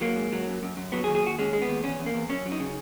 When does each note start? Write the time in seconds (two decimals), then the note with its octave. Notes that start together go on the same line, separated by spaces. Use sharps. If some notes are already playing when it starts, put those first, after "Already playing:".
0.01 F#3 A#3
0.16 G#2
0.32 F#3
0.48 F#2
0.63 F#2
0.77 F#2
0.92 F#3 B3
1.04 G#4
1.07 D#2
1.15 G#4
1.23 D#2 F#4
1.39 G#3 C#4
1.53 G#3
1.62 B3
1.68 D#2
1.83 E2 C#4
1.99 E2
2.06 A#3
2.14 E2
2.29 F#2 C#4
2.45 F#3
2.52 D#4
2.60 C#3